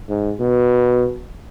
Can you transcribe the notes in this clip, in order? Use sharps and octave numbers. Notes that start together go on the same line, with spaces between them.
G#2
B2